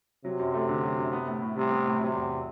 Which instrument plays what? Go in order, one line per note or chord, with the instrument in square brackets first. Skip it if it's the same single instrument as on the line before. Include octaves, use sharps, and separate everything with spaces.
[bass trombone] C3 [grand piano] F#3
[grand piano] F#2
A3
D3
F#3
F#2
B3
A2
A2
[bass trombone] C3 [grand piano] G3
[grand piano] B3
A2
[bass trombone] C3 [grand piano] F#3
[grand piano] E2